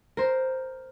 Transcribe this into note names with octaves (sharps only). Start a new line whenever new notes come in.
A#4 C5